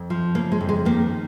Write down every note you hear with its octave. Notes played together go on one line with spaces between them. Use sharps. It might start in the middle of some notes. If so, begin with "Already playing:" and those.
Already playing: F2
F3
C#3 A#3
G#3
F2
G#3
D#3 A#3